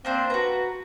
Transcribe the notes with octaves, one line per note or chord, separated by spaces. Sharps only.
A#3 C4 D4 C5
F#4 B4 A#5